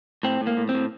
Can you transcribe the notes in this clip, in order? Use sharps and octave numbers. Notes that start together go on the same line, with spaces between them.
A2 C4
A2
A#3
A2
C4
A2